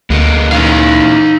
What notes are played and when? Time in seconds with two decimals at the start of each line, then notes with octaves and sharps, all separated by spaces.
0.10 D2 G#3 A#3 B3
0.52 A#2 E3 D#4 F5